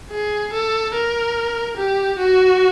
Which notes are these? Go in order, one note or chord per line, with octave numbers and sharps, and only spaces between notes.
G#4
A4
A#4
G4
F#4